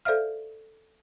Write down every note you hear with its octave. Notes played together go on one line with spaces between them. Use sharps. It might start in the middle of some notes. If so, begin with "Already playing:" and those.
A4 C5 D5 E5 F5 F6